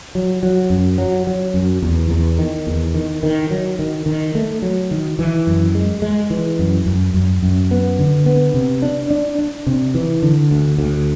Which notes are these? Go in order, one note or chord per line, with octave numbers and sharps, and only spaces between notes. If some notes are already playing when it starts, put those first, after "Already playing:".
F#3
F#3
F#2
F#3
F#3
F#2
E2
E2
D#3
E2
D#3
D#3
F#3
D#3
D#3
A3
F#3
D#3
E3
F#2
G#3
G#3
E3
F#2
F#2
F#2
F#2
B3
D3
B3
C3
D4
D4
D4
C3
E3
D3
D2
D2